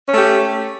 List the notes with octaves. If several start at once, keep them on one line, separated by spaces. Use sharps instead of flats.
A3 C#4 G4